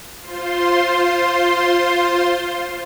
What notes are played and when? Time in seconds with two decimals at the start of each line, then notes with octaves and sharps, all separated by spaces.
0.20 F4 C5 C6